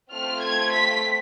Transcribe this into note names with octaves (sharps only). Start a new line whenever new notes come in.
A3 C4 F4 F6
G#6
B6